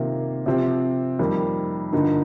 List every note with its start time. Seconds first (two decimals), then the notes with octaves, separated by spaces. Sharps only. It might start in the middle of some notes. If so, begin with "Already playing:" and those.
Already playing: C3 D#3 A#3 F4
0.46 C3 F3 C4 G4
1.19 F2 D#3 G3 A#3
1.92 G2 D3 F3 A#3 D#4